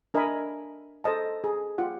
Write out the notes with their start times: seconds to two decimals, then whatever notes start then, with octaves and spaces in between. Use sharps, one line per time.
0.14 D4 A#4 D#5 E5 G#5 B5
1.04 A4 C5 D#5 A5
1.44 G#4
1.78 F4 G4 F#5